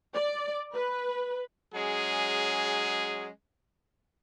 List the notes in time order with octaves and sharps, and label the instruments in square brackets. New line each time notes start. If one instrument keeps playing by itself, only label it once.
[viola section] D5
B4
[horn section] F#3 G#3 C#4 G#4